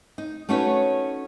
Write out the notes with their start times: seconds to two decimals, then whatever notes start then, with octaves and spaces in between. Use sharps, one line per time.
0.18 D#4
0.49 A3 C#4 D#4 F#4 B4 C#5